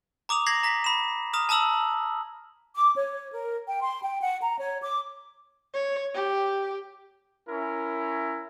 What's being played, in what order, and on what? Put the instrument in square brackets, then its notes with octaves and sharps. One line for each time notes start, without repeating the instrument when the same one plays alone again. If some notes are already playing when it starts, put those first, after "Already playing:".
[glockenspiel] A#5 D6 D#6 F7
G#6 A#6 C7 F#7
A#5 A#6 B6
B5 E7
A#5 D#6 F6
A5 A#5 D#6 E6 F#7
[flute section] D6
C#5
A#4
G5
C6
G5
F#5
A#5
C#5
D6
[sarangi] C#5
G4
[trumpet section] C#4 E4 A#4